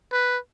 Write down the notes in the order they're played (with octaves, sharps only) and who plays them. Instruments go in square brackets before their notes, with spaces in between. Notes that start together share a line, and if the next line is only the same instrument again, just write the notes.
[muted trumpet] B4